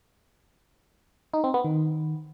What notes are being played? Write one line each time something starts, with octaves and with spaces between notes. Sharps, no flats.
D#4
C4
B3
D#3